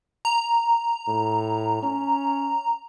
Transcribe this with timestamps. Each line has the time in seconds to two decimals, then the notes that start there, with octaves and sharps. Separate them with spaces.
0.25 A#5
1.08 A2
1.83 C#4